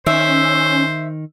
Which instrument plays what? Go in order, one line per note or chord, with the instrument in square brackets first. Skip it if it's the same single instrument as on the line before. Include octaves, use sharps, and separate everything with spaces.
[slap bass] D#3 [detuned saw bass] C#4 [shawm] C5 [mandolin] E5